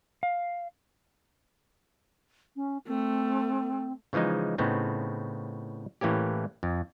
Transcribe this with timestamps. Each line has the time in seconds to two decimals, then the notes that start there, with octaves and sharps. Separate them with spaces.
0.23 F5
2.56 C#4
2.88 A3 C4
4.13 C#3 E3 F3 G#3 D#4
4.58 A2 C#3 B3 C4 D#4
6.01 A2 E3 A#3 C#4 G4
6.63 F2